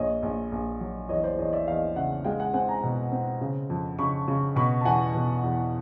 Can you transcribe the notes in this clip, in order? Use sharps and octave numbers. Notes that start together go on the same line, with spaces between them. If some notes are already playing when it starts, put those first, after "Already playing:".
Already playing: A#1 C#5 D#5
A#1
A#1
F#3
E2 C#5 D#5
C5 D5
E2 C#5 D#5
D5 E5
E2 D#5 F5
C#3 E5 F#5
G#3 F5 G5
F#5 G#5
C4 F#5 G#5
G#5 A#5
B2
C4
C#3
F2
C#3 B5 C#6
C#3
B2 B5 C#6
A5
E2 F#5 G#5
B2
E2